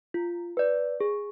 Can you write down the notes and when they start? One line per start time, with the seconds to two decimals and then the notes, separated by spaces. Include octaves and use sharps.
0.14 F4
0.57 B4 D5
1.00 G#4